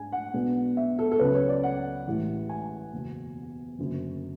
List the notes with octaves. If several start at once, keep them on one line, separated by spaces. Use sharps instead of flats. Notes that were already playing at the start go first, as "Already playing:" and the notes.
Already playing: G#2 G#3 D4 G#5
F#5
B1 B2 G#3 B3 D4
E5
A4
A4
C#2 C#3 F#3 C#4 B4
C#5
D5
F#5
A1 A2 E3 G#3
G#5
F#1 E2 B2
F#1 F#2 D3